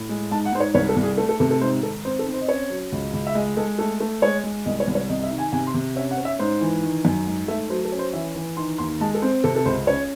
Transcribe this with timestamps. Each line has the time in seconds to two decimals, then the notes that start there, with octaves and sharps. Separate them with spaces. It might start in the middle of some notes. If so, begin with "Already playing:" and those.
Already playing: A2
0.09 G#3
0.31 G#2 A5
0.45 F#5
0.53 G#2 C5
0.60 C#5
0.74 C2 C#5
0.89 A4
0.96 C2
1.03 G#4
1.18 A3 A4
1.29 A4
1.40 C3 A4
1.51 A4
1.61 G#2 C5
1.83 D#3 A4
2.05 C4 C5
2.19 A4
2.27 C4
2.34 C5
2.41 D#5
2.48 C#4 C#5
2.70 F#3
2.92 C#2
3.13 C#2
3.27 E5
3.35 G#3 D#5
3.57 G#3 A4
3.79 A3 A4
4.00 A3
4.22 G#3 C#5
4.44 G#3
4.66 C2 D#5
4.80 C#5
4.87 C2
4.95 C#5
5.09 C3 D#5
5.19 D#5
5.24 E5
5.31 D#3
5.38 G#5
5.52 C3 G#5
5.67 C6
5.74 C3
5.96 C#4 E5
6.11 F#5
6.18 C#4
6.25 E5
6.39 G#2 C5
6.61 E3
6.83 D#3
7.05 F#2
7.27 G#2
7.48 A3 E5
7.70 F#3 C5
7.85 A4
7.92 C#4
7.99 C5
8.13 E3 E5
8.35 E3
8.57 D#3 C6
8.78 D#2 C6
9.01 G#3 A5
9.14 A4
9.22 C4 C5
9.44 C3 A4
9.56 A4
9.65 C#2 C5
9.87 C#4 C#5